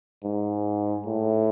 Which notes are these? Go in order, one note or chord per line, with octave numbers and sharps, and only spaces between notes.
G#2
A2